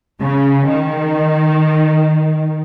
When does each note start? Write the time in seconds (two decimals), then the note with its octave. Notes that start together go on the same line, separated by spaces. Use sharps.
0.21 C#3
0.65 D#3